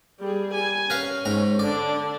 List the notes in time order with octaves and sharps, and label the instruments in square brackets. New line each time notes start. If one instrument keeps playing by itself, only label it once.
[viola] G3 G#4
G#5
[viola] C#4 [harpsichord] A#4 B4 F5
[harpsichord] G#2 A#5
[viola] D3 D4 [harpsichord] D5